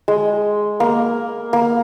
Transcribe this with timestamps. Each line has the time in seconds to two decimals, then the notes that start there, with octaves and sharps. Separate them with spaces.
0.08 G#3
0.80 A#3
1.53 A#3